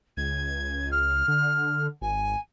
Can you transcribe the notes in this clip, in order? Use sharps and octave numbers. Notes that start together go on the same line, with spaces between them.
C#2 G#6
F6
D3
G#1 G#5